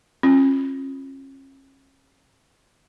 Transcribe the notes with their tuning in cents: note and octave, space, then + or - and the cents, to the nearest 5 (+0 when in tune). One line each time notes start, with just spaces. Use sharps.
C#4 -40 F4 +0